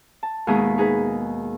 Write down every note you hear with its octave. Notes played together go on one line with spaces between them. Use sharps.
A5
D#2 B2 G#3 G#4 E5 D#6
D#4 G#4 B4